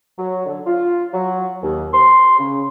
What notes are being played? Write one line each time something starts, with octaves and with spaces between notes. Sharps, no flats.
F#3
D3
F4
F#3
D#2
C6
C#3